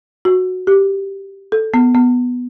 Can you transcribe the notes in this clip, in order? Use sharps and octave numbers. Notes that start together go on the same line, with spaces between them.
F#4
G4
A4
B3
B3